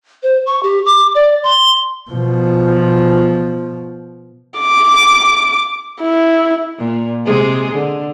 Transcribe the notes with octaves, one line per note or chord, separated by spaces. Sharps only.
C5
C#6
G4
D6
D5
C6
B2 F3
D6
E4
A#2
C3 G#3 G#4
D3